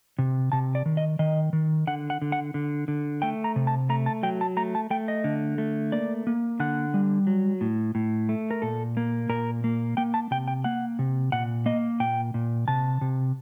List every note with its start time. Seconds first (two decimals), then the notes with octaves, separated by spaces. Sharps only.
0.19 C3
0.52 C3 A5
0.75 D5
0.86 D#3
0.97 D#5
1.19 D#3 D#5
1.53 D#3
1.87 D3 F#5
2.10 F#5
2.22 D3
2.32 F#5
2.54 D3
2.88 D3
3.22 A3 G5
3.44 A#5
3.56 C3
3.67 A5
3.89 A3 A#5
4.06 A5
4.23 F#3 G5
4.41 A5
4.57 A3 A#5
4.75 A5
4.90 A3 G5
5.08 D#5
5.24 D3
5.58 A3
5.92 A#3 D5
6.27 A#3
6.60 D3 F#5
6.94 G3
7.27 F#3
7.61 A2
7.95 A2
8.29 A3
8.51 A#4
8.62 A#2 A4
8.97 A#3
9.29 A#2 A#4
9.64 A#3
9.97 A#3 G5
10.14 A5
10.31 C3 G5
10.48 G5
10.64 A#3 F#5
10.99 C3
11.32 A#2 F#5
11.66 A#3 D#5
12.00 A#2 G5
12.34 A#2
12.68 C3 A5
13.01 C3